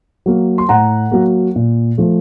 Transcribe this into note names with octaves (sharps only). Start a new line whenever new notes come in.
F#3 A#3
C6
A2 F#5 A#5
F#3 A#3
A#2
F3 A3